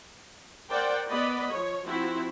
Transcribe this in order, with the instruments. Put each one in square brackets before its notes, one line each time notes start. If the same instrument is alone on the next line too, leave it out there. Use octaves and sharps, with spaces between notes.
[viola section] A#4 C5 D5 F#5 G5
B3 D5 D#5 B5
F3 C#5
F3 C4 E4 F#4